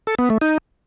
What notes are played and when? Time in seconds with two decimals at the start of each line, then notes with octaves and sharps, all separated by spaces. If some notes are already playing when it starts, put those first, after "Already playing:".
0.07 A4
0.19 B3
0.30 A3
0.41 D#4